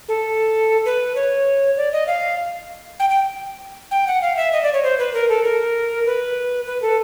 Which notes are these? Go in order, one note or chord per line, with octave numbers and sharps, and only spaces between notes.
A4
B4
C#5
D5
D#5
F5
G5
G5
G5
F#5
F5
E5
D#5
D5
C#5
C5
B4
A#4
A4
A#4
B4
B4
A4